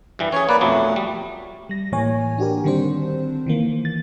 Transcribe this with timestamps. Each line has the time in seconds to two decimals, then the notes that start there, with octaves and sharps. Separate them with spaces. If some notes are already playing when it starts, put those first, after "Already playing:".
0.19 G2 E3 G3
0.32 C#4 G#4 C#5
0.49 A#3 B4 D5
0.61 B1 F2 F#3 A3
0.96 G3
1.69 G3 A#6
1.92 A2 E3 A#3 C#5 G#5
2.38 D4 F#4 G4 A#4
2.64 D3 D#3 G3 C4 D4 C5
3.46 D#3 E3 A#3
3.85 A6